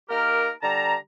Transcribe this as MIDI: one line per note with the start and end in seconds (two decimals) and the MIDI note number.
0.10 0.51 58
0.10 0.51 63
0.10 0.51 67
0.10 0.51 70
0.62 0.95 50
0.62 0.95 55
0.62 0.95 81
0.62 0.95 82